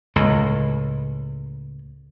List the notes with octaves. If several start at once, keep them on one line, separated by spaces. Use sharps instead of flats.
C#2 A2